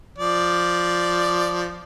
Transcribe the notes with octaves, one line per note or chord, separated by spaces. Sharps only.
F3 D5